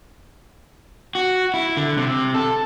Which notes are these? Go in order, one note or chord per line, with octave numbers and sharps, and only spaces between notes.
F#4
E4
D3
C3
A4